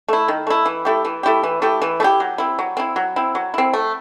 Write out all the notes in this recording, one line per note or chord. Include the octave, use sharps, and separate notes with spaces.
A3 E4
D#3
A3 E4
E3
A3 E4 G4
E3
A3 E4 G4
E3
A3 E4 G4
E3
A3
E4 G4
F#3
C4 E4
F#3
C4 E4
F#3
C4 E4
F#3
C4 E4
A3